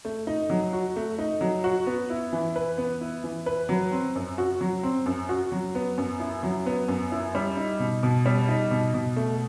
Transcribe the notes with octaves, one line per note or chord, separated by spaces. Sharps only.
A3
D#4
F#3
F#4
A3
D#4
F#3
F#4
B3
E4
E3
B4
B3
E4
E3
B4
F#3
C4
F#2
F#4
F#3
C4
F#2
F#4
F#3
B3
F#2
E4
F#3
B3
F#2
E4
G3
D#4
B2
B2
G3
D#4
B2
B2
A3